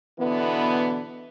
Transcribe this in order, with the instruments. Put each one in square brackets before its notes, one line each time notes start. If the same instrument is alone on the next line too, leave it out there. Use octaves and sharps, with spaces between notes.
[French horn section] B2 D3 E3 B3